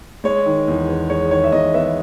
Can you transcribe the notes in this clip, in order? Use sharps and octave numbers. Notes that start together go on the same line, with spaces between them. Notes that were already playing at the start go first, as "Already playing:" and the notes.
G#3 C#5
D#3
E2
B3
G#3 C#5
D#3 C#5
E5
E2 D#5
B3 E5